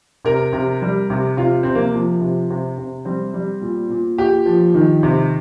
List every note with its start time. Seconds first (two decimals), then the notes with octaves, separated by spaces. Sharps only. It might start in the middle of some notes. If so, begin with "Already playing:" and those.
0.25 C3 A#4
0.53 C3
0.82 G3
1.10 C3
1.37 C3 F4
1.63 C3 C4
1.75 A#3
1.94 F3
2.21 C3
2.50 C3
2.78 C3
3.05 G3 C4
3.34 G3
3.61 A#2
3.89 A#2
4.18 A#2 G4
4.46 F3
4.74 D#3
5.03 C3